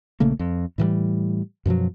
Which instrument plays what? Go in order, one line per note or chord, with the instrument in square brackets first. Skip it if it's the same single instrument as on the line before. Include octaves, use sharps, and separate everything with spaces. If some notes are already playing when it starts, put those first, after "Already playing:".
[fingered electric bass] A#1 C#3 A3 A#3
F2
A2 E3 F3 G3
F#2 B2 F3 F#3